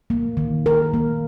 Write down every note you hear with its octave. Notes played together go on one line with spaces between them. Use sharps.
A#3
D#3
A#4
A#3